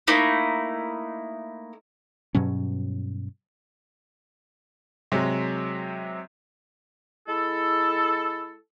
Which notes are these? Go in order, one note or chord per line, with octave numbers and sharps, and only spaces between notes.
A3 A#3 D#4 E4
G2 B2 F#3 C#4
C3 F#3 G#3
G#3 E4 A4